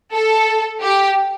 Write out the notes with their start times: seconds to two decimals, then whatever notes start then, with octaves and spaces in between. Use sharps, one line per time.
0.12 A4
0.81 G4